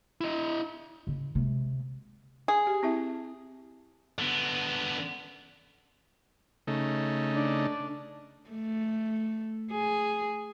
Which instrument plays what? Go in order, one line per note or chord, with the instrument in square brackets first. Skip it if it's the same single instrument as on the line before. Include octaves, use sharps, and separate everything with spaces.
[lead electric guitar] E4 D#5
[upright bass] C#3
C3 G#3
[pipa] G#4
[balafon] G4
C4 E4 E5
[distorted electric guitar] D3 B3
[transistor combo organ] C#3 A3 D#4
[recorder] D4
[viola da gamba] A3
G#4